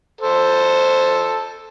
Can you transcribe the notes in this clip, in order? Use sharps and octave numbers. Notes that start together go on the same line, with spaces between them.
A4 C5